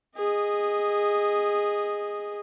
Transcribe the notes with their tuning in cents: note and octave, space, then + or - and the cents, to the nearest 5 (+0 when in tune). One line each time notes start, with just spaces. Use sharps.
G#4 -15 D#5 +0